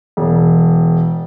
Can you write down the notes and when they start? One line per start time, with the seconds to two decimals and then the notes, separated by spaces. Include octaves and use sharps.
0.17 E1